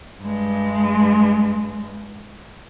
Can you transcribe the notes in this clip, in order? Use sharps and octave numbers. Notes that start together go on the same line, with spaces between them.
G2 G#3